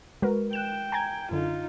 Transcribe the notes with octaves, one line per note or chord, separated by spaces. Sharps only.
G#3 F#4 A#4 B4
G5 F#6 E7
G#5 A#5 G#6
F#2 D3 D#4 F4